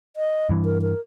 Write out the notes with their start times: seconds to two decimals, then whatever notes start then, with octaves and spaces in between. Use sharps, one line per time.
0.16 D#5
0.49 G2 E3
0.65 A#4
0.82 A#4